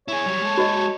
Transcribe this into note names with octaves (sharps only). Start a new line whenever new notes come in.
E4 G#4 C#5
F#3 G3
G#3 A4
F#4 D#5